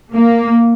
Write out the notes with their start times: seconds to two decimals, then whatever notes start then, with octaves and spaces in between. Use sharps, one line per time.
0.14 A#3